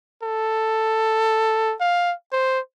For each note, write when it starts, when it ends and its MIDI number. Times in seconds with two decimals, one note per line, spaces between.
0.23 1.75 69
1.80 2.13 77
2.32 2.60 72